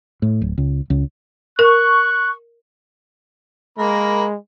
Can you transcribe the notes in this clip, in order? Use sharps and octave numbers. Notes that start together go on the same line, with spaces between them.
A2
D1
C#2
C#2
A#4 C#6 F#6
G#3 A#3 A#4 B5